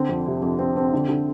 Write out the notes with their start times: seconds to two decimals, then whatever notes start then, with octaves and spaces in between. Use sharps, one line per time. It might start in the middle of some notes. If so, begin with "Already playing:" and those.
Already playing: D3 C4
0.09 F2
0.27 C3
0.42 F2
0.59 C4
0.77 C4
0.93 D3
1.09 D3